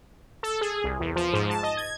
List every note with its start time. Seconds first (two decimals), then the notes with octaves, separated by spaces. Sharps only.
0.43 A4
0.61 G#4
0.84 C2
1.00 E2
1.16 F3
1.33 G#2
1.50 A5
1.63 D#5
1.77 G#6